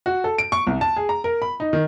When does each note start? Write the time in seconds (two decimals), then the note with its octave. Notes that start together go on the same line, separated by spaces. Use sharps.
0.06 F#4
0.24 A4
0.38 D7
0.52 C#6
0.67 C2
0.81 A5
0.96 G#4
1.09 A#5
1.24 A#4
1.42 B5
1.60 D#4
1.73 D#3